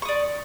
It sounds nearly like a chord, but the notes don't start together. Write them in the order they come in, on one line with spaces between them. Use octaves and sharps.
C#6 D#6 D5